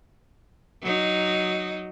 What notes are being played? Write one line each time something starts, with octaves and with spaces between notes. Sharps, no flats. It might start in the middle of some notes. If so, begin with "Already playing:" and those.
F#3 D#4